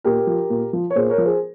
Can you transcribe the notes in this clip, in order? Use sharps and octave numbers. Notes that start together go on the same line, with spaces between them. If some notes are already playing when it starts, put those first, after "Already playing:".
A#2 G4 A#4
F3
A#2
F3
C#5
A#2 G#4 C5
A#4 C#5
F3
G#4 C5